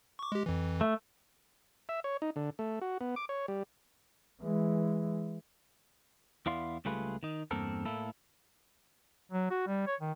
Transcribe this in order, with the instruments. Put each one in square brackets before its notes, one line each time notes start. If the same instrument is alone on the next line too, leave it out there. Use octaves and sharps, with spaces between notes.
[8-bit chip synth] C#6 D6
G#3 G4
F2 E3
[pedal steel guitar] A3
[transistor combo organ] E5
C#5
D#4
D3
A3
F#4
B3
D6
C#5
G3
[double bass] E3 G#3
[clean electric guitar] E2 B3 E4 D5 F5 C6
C#2 G3 A3 F4 G#4 B4
D#3 D#4
E2 G2 A#3 C4 A4 A#4
A2 A#3 E4 A4
[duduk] F#3
F#4
G3
C#5
D#3